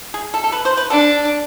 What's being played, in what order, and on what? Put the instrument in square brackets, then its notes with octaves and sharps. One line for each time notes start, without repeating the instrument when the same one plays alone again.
[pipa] G#4
A4
A4
B4
C5
B4
[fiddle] D4 [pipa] A4